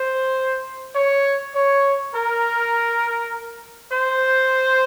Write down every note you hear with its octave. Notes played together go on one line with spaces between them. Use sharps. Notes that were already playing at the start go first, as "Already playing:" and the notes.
Already playing: C5
C#5
C#5
A#4
C5